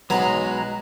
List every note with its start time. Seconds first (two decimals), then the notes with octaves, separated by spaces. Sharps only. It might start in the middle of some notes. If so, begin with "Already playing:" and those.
0.10 B1 F#3 G#3 B3 A#5